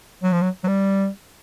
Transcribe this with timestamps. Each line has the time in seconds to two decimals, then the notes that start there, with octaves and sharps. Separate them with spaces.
0.23 F#3
0.32 F3
0.42 F#3
0.64 F#3
0.67 G3